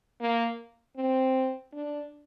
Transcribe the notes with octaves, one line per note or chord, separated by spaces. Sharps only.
A#3
C4
D4